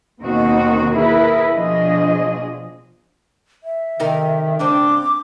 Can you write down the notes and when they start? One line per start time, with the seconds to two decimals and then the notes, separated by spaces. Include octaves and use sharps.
0.21 D#2 B2 D#3 C4 D#4 F#4
0.96 E4 G#4 A#4 B4
1.53 B2 F3 D4 G#4 D#5
3.64 E5
4.00 C3 D#3 D#4 A#4
4.59 G#2 C#3 C4 D4 D6